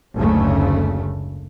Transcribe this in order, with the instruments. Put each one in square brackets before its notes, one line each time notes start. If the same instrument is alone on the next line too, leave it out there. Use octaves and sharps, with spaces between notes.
[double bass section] F#1 D2 G#2 C#3 A3